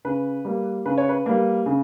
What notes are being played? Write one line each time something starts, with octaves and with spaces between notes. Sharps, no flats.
C#3 B4
G3 A#3
C#3 B4
C#5
B4
G3 A#3
C#3